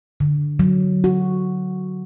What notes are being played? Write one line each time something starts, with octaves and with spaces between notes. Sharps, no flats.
D3
F#3
F#4